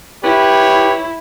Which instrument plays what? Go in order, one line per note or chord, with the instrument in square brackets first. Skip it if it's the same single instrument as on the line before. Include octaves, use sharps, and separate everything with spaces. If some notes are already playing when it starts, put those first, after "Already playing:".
[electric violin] E4 [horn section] G4 B4 C#5